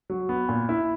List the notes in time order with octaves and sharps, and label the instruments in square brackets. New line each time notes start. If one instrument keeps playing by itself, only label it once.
[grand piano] F#3
B3
A#2
E4